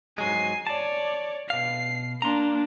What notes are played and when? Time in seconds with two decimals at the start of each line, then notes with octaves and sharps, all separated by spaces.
0.18 G#2 F#3 G#3 G#5 C7
0.67 C#5 D5 A5
1.50 B2 F5 C7
2.22 A#3 D4 A#5 C6